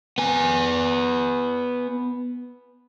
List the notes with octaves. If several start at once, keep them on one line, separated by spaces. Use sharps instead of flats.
B3 G#5